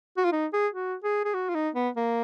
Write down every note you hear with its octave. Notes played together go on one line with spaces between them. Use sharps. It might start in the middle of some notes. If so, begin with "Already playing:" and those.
F#4
F4
D#4
G#4
F#4
G#4
G#4
F#4
F4
D#4
B3
A#3